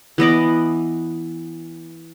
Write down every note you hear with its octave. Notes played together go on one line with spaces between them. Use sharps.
E3 B3 D#5 D6